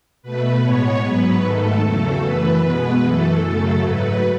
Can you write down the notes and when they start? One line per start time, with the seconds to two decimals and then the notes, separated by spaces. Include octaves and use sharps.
0.22 B2 A3 B4
0.62 A2 G#3 B3 C#5
1.03 G#2 F#3 B3 B4
1.42 G#2 D#3 A3 A4
1.83 E2 C#3 F#3 A3 A4
2.22 F#2 E3 A3 B4
2.63 B2 G#3 B3 B4
3.03 F#2 E3 A3 A4
3.43 F#2 C#3 F#3 A3 A4
3.83 G#2 F#3 A3 B4